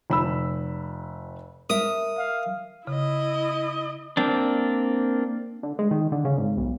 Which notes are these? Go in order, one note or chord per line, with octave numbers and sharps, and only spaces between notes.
F1 B5 E6
A#4 E5 D#6
F5
C#3 E4 D#5
A#3 C4 D4
D3
G#3
D#3
D3
C#3
G#1
B1